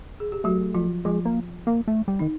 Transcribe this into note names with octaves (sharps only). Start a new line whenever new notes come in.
G#4
G4
F#3 A3 F#4
F3 F4
F3 G#3 F4
A#3
A#3
A3
G3
D#3 D#4